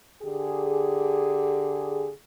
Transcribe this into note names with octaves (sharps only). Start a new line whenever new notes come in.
D3 G4 G#4